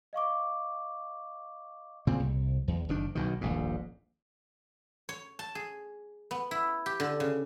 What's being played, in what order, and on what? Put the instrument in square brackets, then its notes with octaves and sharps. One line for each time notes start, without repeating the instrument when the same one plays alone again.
[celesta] D#5 F5 C#6 D6
[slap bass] A#2 C#3 C4
C2
E2
F#1 D#3 D4
B1 B2 D#3
D#1 A#1 G#2
[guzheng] C#5
A5
G#4
B3
E4
G4
D3
C#3